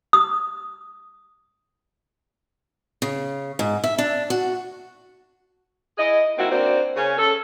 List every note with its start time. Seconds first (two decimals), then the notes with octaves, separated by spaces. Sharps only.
0.13 D#6
3.02 C#3
3.59 G#2
3.84 E5
3.98 D4
4.30 F#4
5.98 E4 G#4 D#5
6.38 A#3 C4 D#4 E4 F#4
6.51 A#3 C4 D4 F#4 C5
6.96 C#3 A#3 C#4
7.17 C#4 A4